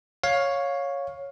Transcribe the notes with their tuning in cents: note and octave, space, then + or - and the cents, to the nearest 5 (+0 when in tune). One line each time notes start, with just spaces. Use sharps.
C#5 +0 F5 +15